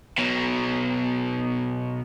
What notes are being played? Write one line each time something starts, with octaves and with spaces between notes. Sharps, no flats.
B2 F#3